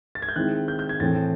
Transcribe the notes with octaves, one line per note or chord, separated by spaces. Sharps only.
A6
G#6
G6
D#3 G#3 C4 E4 F#6
G6
G6
G#6
A2 E3 A3 C4 A6